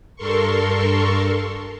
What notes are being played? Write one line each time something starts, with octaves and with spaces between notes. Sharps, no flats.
G2 A4 A#4 C6 C#6